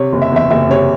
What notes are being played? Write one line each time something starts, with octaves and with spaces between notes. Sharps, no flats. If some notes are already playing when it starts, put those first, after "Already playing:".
Already playing: C3 C#5
F#1
E5
E2 E5
F#1 E5
C3 C#5